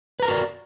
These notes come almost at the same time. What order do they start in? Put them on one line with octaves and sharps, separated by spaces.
B4 A#5 A#4 F#4 D5